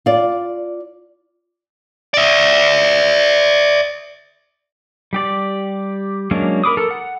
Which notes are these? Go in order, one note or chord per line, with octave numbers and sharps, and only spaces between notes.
F4 D5
D5 E5
G3 G4 D5
F#3 G#3 A#3 C#4 D4
A#4 B5 D6 D#6
A4 A#4 A5
F#5